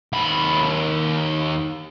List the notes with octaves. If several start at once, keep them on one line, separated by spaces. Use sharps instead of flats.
D#2 B5